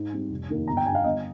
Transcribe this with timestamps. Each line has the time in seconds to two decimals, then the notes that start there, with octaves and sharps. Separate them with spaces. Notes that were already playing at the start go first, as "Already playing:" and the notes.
Already playing: G#2
0.12 G3 C4
0.30 F1
0.50 D#2 D#3 A#3
0.67 G1 A#5
0.77 G5
0.86 G2 G3 G#5
0.95 F5
1.04 G1 D#5